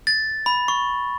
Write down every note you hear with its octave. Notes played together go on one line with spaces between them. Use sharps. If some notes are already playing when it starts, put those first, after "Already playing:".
A6
B5
C#6